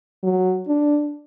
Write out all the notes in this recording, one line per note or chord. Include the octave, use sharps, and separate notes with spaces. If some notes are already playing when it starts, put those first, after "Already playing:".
F#3
D4